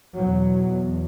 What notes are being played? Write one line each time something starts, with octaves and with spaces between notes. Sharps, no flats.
E2 B2 F#3